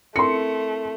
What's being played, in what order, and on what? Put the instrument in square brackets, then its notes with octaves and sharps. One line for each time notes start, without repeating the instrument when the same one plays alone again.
[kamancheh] A3 [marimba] C4 E4 A#4 [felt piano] C6 C#7